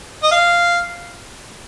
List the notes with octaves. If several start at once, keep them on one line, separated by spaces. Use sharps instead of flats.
D#5
F5